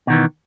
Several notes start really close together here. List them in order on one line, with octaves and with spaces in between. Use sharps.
B2 D#3 E3